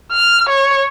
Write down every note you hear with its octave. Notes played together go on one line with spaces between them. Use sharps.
F6
C#5